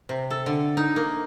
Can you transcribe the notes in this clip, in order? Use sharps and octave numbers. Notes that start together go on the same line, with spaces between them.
C3
A4
D3
D#4
A#3